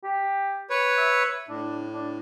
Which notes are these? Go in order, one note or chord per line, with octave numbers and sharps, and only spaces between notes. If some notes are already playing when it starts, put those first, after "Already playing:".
G4
B4 C#5
E5
A2 D4
D4